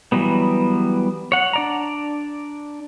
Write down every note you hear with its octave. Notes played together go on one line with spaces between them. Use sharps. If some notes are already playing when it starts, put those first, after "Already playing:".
E3 F#3 G3 B3
C#5 F#5
D4 D5 A#5